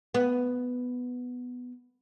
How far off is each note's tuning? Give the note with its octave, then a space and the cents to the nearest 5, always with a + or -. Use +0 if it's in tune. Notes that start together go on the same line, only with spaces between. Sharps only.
B3 +5